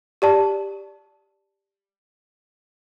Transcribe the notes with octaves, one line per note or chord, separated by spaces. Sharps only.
G4 D5 A5